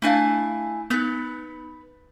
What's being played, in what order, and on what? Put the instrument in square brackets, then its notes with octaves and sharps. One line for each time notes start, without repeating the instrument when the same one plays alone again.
[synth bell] A3 D4 F5 [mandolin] E4 G#5 A5
[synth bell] B3 D#4 [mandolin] B4 G6